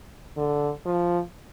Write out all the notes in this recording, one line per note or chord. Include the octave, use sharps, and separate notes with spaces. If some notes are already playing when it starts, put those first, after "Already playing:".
D3
F3